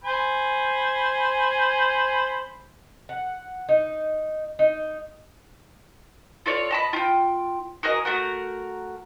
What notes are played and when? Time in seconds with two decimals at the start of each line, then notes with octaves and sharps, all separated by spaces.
0.04 C5 G#5 B5
3.09 F#5
3.69 D#4
4.59 D#4
6.46 F4 A4 C#5 D5
6.70 D#5 A5 B5
6.93 F4 G5
7.83 F#4 G#4 A#4 D#5
8.05 A3 F#4 A#4 F#5